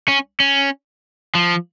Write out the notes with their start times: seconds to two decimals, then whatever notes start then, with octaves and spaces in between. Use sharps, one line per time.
0.08 C#4
0.40 C#4
1.35 F3